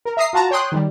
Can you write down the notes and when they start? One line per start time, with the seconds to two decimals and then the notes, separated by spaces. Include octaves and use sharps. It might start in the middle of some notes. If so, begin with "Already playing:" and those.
0.05 A#4
0.17 E5 A#5 D#6 C7
0.33 F4 F#4 A5 A#5
0.51 C#5 G5 C6 D#6 F#6
0.72 D#3 G3